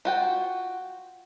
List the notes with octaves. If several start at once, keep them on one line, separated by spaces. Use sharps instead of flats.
F4 F#4 G5